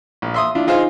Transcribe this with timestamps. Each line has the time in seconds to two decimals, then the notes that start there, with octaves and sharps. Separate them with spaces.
0.22 A#1
0.34 E5 C6 D#6
0.55 D4 E4 F4
0.67 D#4 F4 G#4 C5 F5